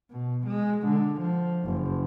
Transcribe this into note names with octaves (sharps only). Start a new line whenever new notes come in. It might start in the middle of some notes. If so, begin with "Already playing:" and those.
B2
G#3
D3
F3
F#1